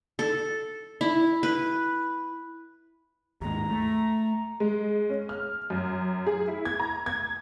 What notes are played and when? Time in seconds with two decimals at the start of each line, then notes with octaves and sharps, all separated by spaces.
0.19 A4
1.01 E4
1.43 B4
3.41 D#2 G#2 A#5
3.70 A3
4.60 G#3
5.09 C#4
5.29 F6
5.70 F#2
6.27 G#4
6.48 E4
6.65 G#6
6.80 A#5
7.06 G#6